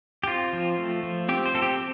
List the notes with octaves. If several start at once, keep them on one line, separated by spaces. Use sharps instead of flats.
G4
C4 F4
F3
A3
F3
C4 G4
C5
C4 A4
G4